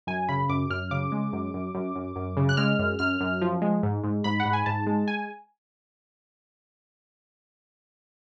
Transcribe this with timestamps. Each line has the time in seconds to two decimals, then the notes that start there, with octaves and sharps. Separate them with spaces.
0.07 F#2 G#5
0.29 C#3 B5
0.49 F#2 D6
0.70 F#2 F6
0.91 C#3 D6
1.12 G#3
1.33 F#2
1.54 F#2
1.75 F#2
1.96 F#2
2.16 F#2
2.37 C#3
2.49 F#6
2.57 G#3 F6
2.79 F#2
2.99 F#2 F6
3.20 F#2
3.42 F3
3.62 G#3
3.83 G#2
4.04 G#2
4.24 G#2 B5
4.40 F#5
4.45 G#2
4.53 G#5
4.66 G#2 A5
4.87 G#3
5.08 G#5